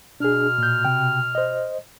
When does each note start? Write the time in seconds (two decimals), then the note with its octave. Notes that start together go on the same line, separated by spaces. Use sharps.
0.20 B2 D4 G#4 F6
0.58 A#2 G6
0.85 C3 G5
1.35 C5 D#5